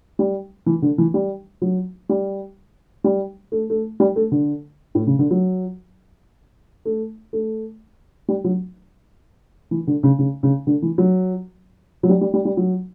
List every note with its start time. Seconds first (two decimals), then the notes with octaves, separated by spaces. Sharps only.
0.19 G3
0.66 E3
0.82 D3
0.98 E3
1.14 G3
1.62 F#3
2.09 G3
3.04 G3
3.52 A3
3.70 A3
4.00 G3
4.16 A3
4.32 D3
4.95 A2
5.07 C#3
5.19 D3
5.31 F#3
6.85 A3
7.33 A3
8.28 G3
8.44 F#3
9.71 E3
9.87 D3
10.03 C#3
10.19 C#3
10.43 C#3
10.67 D3
10.82 E3
10.98 F#3
12.03 F#3
12.09 G3
12.21 G3
12.34 G3
12.45 G3
12.57 F#3